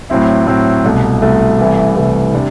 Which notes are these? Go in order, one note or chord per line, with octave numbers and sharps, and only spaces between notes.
A2 F#3 C4 E4
A2 F#3 C4 E4
C2 B2 A3
C2 B2 A3
C2 C3 E3 A3
C2 C3 E3 A3
C3 G3 D4